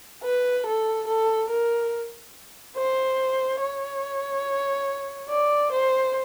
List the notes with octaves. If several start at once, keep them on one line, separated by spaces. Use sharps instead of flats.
B4
A4
A4
A#4
C5
C#5
D5
C5